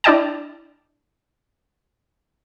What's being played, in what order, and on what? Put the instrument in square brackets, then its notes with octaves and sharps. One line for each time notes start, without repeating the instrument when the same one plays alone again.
[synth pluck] D4 E4 D5 D#5 G5 A5